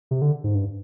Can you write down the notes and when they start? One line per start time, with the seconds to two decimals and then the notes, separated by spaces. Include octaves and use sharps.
0.11 C3
0.22 D3
0.44 G#2
0.55 G2